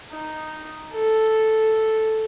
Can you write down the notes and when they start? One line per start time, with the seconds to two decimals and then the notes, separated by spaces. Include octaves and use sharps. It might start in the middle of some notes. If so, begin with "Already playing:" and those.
0.11 D#4
0.93 A4